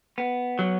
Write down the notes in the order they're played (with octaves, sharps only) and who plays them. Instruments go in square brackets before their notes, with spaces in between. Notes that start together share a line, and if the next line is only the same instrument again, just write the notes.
[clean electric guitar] B3
F#3